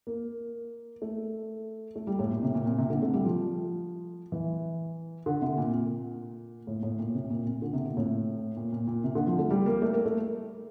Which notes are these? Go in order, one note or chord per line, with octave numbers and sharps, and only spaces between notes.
A#3
A3
A3
G3
A2
A#2
C3
A#2
A#2
C3
D3
A3
G3
F3
E3
D3
C3
A#2
A#2
A2
A2
A#2
C3
A#2
A#2
D3
C3
A#2
A2
A#2
A#2
A#2
C3
D3
F3
A3
G3
A#3
A3
A#3
A3